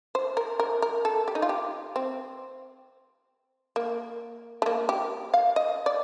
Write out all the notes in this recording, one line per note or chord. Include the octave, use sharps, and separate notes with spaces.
C5
A#4
A#4
A#4
A4
G4
D#4
F4
G4
C4
A#3
A3
A#3
G4
F5
D#5
D5